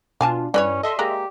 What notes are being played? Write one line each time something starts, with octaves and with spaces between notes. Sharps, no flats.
B2 D4 F4 F5 G#5 A5
G2 E3 G3 C#4 B4 C#5 D5
A4 D#5 E5 C6
G#3 A#3 G4 A#5